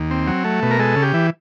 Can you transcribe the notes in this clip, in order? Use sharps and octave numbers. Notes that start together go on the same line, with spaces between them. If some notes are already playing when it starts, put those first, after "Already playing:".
Already playing: D#2
C4
F#3
A3
B2
A#4
G#3 A4
C#3
G4
E3